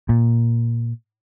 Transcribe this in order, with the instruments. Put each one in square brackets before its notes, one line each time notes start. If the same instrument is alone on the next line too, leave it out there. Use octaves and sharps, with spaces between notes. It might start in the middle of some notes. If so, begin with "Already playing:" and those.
[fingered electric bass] A#2